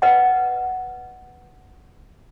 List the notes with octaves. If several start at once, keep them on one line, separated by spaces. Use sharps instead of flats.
B4 D#5 F#5